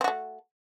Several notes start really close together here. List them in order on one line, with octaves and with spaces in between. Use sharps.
C4 F#4 A3